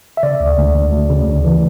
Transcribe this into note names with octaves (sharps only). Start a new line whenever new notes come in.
E5
C#3 D5
D2
D2
D2
D2
C#3
D2
E3